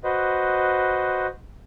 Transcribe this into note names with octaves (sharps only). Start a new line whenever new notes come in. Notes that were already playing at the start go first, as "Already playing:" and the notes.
F#4 B4 C5 D#5